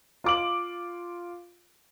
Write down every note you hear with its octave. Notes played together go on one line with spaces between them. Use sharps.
F4 D6 F#7